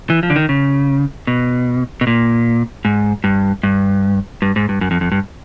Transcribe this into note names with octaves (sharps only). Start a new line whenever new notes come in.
E3
F3
D3
D#3
C#3
B2
B2
A#2
G#2
G2
G2
G2
G#2
G2
F#2
F2
F2
G2